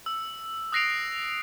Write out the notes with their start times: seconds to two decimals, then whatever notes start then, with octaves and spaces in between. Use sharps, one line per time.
0.06 E6
0.72 D#6 F#6 A#6 C7 D7 F7